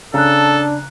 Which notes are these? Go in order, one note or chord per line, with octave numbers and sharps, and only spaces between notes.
C#3 D4 A4 A#5 F#6